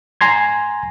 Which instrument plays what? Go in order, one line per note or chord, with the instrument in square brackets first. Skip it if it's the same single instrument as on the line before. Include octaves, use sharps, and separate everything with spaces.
[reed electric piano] G#5 A#5 C6 G#6